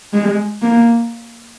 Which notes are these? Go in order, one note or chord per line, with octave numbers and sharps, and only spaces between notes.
G#3
A#3